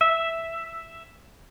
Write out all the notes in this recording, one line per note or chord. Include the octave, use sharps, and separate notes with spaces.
E5